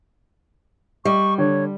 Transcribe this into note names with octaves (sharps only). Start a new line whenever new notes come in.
G3 D#5 C#6
D3 C#5